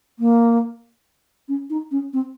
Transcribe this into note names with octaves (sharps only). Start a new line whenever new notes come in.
A#3
C#4
D#4
C#4
C4